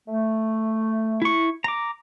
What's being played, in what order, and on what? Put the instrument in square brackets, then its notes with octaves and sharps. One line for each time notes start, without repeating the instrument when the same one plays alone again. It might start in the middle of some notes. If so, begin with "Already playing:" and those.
[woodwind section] A3
[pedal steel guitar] E4 C#6
A#5 D6